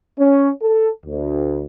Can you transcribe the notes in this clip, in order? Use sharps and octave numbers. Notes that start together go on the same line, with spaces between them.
C#4
A4
D2